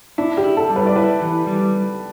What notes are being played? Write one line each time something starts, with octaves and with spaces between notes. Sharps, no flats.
D4 E4
G4
E4
A4
G3
B4
D5
E4 B4
E3
G3